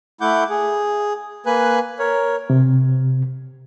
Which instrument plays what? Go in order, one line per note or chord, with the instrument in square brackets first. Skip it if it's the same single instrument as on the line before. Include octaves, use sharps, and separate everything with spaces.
[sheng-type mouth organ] A3 E4 F#5 D6 G6
G#4
A#3 B4 G#5 F#6
A#4 C#5
[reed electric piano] C3